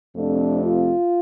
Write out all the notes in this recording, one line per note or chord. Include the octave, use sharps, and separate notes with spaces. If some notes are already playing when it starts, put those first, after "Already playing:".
F2 C3 F3 A3 D4
F4